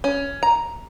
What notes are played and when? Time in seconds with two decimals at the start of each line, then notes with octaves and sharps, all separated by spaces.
0.04 C#4
0.43 A#5